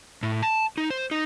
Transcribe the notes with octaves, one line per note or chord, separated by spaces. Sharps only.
A2
A5
D#4
C5
D#4